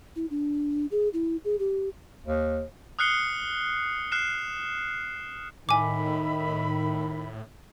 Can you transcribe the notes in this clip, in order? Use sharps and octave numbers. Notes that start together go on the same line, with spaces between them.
E4
D4
G#4
E4
G#4
G4
D#2
D#6 F6 F#6 C7 C#7 G7
F6 F#6 C7 E7
A2 D#3 E5 G#5 B5 D6